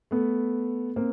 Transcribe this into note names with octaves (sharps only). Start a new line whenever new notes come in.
A3 B3
A#3 C4